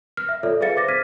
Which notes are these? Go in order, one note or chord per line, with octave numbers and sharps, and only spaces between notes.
F6
E5
F4 A4 C#5 D5 E5
G#4 B4 E5 F5 A6 C#7
C5 D6 A6 A#6
F6 G#6 B6 D#7